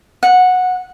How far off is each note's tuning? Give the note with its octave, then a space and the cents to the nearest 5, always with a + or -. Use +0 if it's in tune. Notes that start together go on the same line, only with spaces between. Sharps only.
F#5 -15